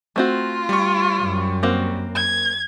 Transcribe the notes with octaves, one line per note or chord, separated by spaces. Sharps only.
A3 C4 F4 F#4
G3 C#6
F#2
A#3 C4 F#4
G#6